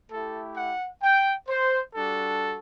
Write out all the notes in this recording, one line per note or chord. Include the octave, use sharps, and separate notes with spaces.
A3 E4 G4 A4
F#5
G5
C5
G3 D4 F#4 A4